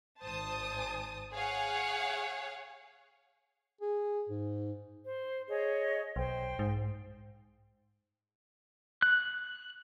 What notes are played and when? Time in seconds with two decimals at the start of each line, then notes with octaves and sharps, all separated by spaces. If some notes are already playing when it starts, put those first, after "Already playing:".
0.21 G#1 C5 A5 D#6
1.32 G#4 C#5 F5 F#5
3.81 G#4
4.29 G#2
5.05 C5
5.49 G#4 C#5 D#5
6.16 B1 C5 G5
6.59 G#2
9.02 F#6